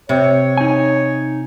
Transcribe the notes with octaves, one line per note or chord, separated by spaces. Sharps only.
C3 C#5
D#4 G#5